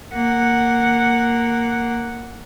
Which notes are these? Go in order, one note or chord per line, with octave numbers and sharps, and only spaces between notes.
A#3 F#5